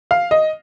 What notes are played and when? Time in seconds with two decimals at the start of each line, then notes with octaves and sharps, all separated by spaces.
0.11 F5
0.31 D#5